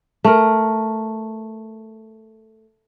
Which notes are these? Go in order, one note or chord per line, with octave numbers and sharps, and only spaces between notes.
A3 A#4